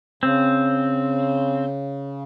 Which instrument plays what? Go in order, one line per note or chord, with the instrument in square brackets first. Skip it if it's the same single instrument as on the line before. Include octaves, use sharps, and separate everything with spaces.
[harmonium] C#3 [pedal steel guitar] C4